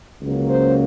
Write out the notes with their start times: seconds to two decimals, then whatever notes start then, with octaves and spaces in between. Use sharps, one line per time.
0.22 C#2 C#3 F#3 A#3
0.50 C5